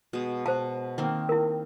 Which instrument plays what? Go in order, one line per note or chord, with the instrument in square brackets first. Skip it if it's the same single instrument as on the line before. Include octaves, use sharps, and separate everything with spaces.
[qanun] B2 G#3
[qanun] B2 [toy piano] C5 A5
[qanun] D#3 A#3 C4
[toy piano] E4 A#4